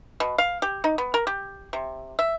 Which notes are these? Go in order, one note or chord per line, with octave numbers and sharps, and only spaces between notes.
B2
F5
G4
D#4
B3
A#4
G4
C3
E5